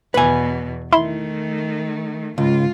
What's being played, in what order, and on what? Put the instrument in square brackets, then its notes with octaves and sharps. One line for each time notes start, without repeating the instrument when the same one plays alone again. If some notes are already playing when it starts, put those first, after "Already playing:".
[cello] E2 B2 [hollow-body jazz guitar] B4 G#5
[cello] D#3 A3 [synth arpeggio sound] E4 [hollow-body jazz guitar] C6
[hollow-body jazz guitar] C#2 [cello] G#2 F4